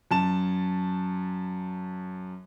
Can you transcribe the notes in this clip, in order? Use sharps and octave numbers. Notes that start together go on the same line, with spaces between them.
F#2 A5 E7